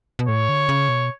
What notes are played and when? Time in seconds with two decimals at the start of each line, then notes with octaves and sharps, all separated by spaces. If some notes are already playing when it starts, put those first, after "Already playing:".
0.19 B2
0.28 A2 C#5
0.49 D3
0.69 C#3
0.89 B2